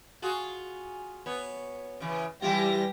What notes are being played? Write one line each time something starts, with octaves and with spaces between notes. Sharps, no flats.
F4 F#4 G#4
B3 C#5
C#3 E3
E3 G3 E4 F4 G4 A#6